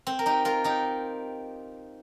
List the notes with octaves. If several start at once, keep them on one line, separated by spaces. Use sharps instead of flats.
C4
A#4
D#4 G4
F4 A#4
D#4 G4